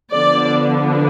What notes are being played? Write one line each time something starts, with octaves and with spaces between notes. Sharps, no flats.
D3 F3 B3 D4 D5